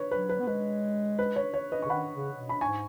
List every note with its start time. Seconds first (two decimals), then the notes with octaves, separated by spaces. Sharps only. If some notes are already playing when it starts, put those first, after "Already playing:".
Already playing: B4 C#5
0.11 F#3 B4
0.29 B4
0.40 B3
0.47 G#3 B4
1.19 B4
1.36 C#5
1.54 C#5
1.72 B4 D#5
1.82 C#6
1.86 C#3
1.89 D#3 F#5 B5
2.14 C#3
2.37 B2
2.49 B5
2.61 G#2 G#5 C#6